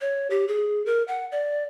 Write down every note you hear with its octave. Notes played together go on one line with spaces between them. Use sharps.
C#5
G4
G#4
A#4
F#5
D5